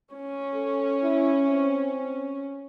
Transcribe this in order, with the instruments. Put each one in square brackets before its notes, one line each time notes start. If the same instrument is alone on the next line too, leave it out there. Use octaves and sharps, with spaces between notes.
[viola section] C#4
[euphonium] A4
E4
C4